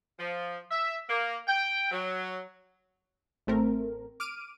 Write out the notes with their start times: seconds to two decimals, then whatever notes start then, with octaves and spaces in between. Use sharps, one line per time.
0.19 F3
0.70 E5
1.08 A#3
1.48 G5
1.91 F#3
3.47 A1 A3 C4 A#4
4.20 D6 F6 D7 D#7